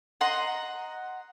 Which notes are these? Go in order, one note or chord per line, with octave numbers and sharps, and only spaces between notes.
D#5 F#5 A#5 C6